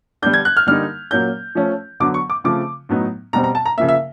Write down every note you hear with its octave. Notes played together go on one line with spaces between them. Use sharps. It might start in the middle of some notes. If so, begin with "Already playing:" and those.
D3 G3 B3 D4 G6
G#6
F#6
F6
D3 G3 A#3 D#4 F6
A#2 F#3 A#3 C#4 G6
F3 A3 C#4
D3 F#3 B3 D6
C#6
D6
C#3 F3 A3 C4 D6
A2 F#3 B3 D#4
B2 G3 C4 A#5
A#5
A5
A#5
C#3 F3 A#3 E5
E5